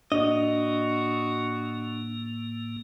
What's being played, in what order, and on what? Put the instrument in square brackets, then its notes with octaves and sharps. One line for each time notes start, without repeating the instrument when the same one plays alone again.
[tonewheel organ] A2 A#3 [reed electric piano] D4 [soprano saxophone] F#4 [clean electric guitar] D#5